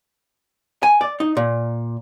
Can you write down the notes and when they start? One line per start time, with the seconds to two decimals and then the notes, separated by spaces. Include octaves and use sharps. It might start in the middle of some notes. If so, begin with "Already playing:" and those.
0.83 G#5
1.01 D5
1.20 D#4
1.37 A#2